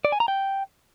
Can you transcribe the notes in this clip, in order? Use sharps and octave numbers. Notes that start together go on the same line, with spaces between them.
D5
G#5
A#5
G5